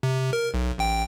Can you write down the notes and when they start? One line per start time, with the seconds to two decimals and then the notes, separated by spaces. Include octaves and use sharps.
0.03 C3
0.33 A#4
0.54 B1
0.78 A1 G5